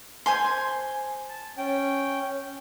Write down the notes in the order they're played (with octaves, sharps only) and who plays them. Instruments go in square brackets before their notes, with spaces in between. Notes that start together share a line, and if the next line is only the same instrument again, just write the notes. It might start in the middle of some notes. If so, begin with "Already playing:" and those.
[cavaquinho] C5 G#5 C6
[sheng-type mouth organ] A5
C#4 G5